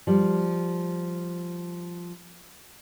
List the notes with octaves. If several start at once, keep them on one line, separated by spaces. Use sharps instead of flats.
F3 G3